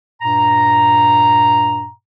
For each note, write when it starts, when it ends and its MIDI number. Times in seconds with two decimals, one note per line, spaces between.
0.22 1.89 43
0.22 1.89 46
0.22 1.89 82